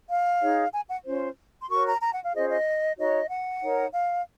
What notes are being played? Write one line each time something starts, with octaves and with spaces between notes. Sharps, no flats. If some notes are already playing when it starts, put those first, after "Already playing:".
F5
D#4 G#4 C#5
G#5
F#5
C#4 F4 C5
C6
F#4 A#4 C#5 C#6
A#5
A#5
F#5
F5
C#4 F4 G#4 C5 D#5
D#5
D#4 F#4 C#5 D#5
F#5
D#4 A#4 C#5
F5